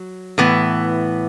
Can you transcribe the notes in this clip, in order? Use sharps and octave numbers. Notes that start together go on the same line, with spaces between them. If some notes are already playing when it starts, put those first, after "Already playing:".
Already playing: F#3
A2 E3 B3